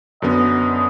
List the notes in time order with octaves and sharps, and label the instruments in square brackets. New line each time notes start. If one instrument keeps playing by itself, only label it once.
[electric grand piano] F#2 D3 B3 [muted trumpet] D#5